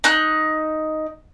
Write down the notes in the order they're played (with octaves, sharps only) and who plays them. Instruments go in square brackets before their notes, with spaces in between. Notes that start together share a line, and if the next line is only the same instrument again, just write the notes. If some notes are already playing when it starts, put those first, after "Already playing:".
[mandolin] D#4 F#6